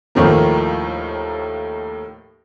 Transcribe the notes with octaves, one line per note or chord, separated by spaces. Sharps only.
D#2 A2 D#3 F3 A#3